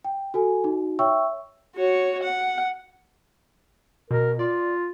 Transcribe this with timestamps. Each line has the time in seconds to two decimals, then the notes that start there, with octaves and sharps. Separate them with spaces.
0.05 G5
0.34 F#4 A4 G#5
0.64 D#4 F#4
0.99 C#5 E5 G5 C#6 E6
1.76 F#4 C#5
2.23 F#5
4.11 B2 A#4
4.39 F4 D5